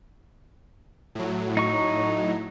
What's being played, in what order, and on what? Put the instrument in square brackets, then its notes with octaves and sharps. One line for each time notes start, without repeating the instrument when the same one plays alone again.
[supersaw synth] A2 F#3
[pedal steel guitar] D#4 C#6